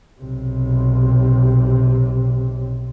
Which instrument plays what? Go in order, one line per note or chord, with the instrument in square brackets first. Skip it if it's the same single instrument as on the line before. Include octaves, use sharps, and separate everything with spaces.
[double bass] B1 C3